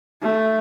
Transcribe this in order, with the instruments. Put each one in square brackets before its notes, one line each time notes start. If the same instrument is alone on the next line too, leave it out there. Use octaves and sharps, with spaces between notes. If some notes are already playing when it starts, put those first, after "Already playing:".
[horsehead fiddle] A3